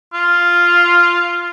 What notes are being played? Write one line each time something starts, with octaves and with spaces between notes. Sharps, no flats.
F4